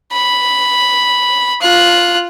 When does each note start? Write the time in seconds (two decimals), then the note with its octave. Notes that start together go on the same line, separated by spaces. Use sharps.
0.12 B5
1.61 F4 F#6